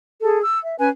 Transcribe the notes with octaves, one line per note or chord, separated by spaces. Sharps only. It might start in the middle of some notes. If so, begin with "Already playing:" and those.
G#4 A4
E6
E5
C#4 B4 G#5